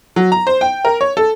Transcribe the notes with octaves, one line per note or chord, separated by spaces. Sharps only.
F#3
A#5
C5
G5
A#4
C#5
A4